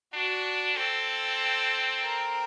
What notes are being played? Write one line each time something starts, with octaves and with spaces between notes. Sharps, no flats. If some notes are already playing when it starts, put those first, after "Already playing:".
D4 F#4
C4 A4
A#4